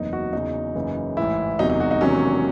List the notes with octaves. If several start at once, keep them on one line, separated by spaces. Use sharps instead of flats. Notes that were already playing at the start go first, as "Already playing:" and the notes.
Already playing: F#1 E2 C3 E3 D#4
F#4
E2 C#3 F#3 D#4
F#1 F#2 C#3 E3
A1 G#2 E3 E4
E1 E2 C3 F#3 D#4
D#4
F#4
D#4
E1 E2 C3 D#3 F#3 C#4